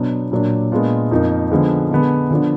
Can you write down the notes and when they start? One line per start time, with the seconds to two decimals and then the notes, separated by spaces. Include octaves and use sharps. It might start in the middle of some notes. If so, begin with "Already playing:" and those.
Already playing: B2 F#3 B3 D4
0.31 A#2 F#3 D4
0.72 A#2 G#3 B3 D4 F4
1.11 F2 F3 A#3 D#4
1.51 D3 F3 G#3 B3
1.91 D3 G#3 B3
2.31 D3 F3 B3 D4